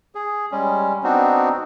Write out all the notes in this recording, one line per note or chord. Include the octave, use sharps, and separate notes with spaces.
G#4
G3 G#3 C#4
B3 C4 D4 D#4 F#4